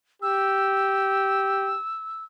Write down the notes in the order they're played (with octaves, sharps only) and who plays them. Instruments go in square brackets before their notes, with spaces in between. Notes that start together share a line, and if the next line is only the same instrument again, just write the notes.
[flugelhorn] G4 [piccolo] E6